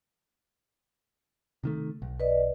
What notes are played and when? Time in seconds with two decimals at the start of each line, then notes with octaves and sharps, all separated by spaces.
1.64 C3 D#3 A3
2.02 B1
2.20 B4 D5 D#5